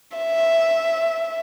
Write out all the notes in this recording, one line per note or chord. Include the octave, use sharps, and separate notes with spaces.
E5